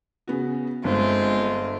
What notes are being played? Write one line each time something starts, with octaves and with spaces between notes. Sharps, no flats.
C#3 B3 F#4
G1 D3 G#3 C4 F4 B4